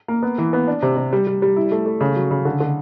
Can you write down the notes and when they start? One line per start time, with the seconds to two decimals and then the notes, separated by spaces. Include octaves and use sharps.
0.08 A#3
0.23 B3
0.38 E3
0.53 B3
0.67 D4
0.82 C3
0.97 C3
1.13 G3
1.27 G3
1.42 G3
1.56 E4
1.72 A3
1.86 A3
2.01 C#3
2.16 F#3
2.31 C#3
2.45 D3
2.60 D3